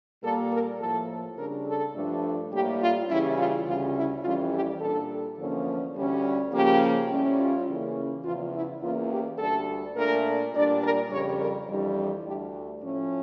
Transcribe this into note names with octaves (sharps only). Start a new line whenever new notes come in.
A#2 G3 A#3 A4
A#4
A2 F3 A#3 A4
C#3 G3 D4 A#4
A4
G2 F3 A3 D4
A2 G3 A#3 G4
F4
C#3 E3 G3 C#4 E4
F4
D2 C#3 G3 C#4 F4
E4
F2 E3 G3 C#4 F4
G4
A#2 G3 D4 A4
E2 D3 F3 A#3 C#4
D2 D3 G3 C#4
C#3 F3 A#3 C#4 G4
A2 G3 C#4
F4
C#3 E3 A#3 C#4
E2 C#3 F3 F4
E4
E2 E3 A#3 C#4 F4
G4
D2 D3 G3 A4
A#2 A3 D4 A#4
A#2 G3 D4 D5
A#4
F2 C#3 G3 C#5
A#4
F2 E3 G3 D4
D2 D3 A3 D4 G4
A2 F3 C#4